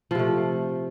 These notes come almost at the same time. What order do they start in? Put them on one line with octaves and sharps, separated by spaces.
F3 C3 A3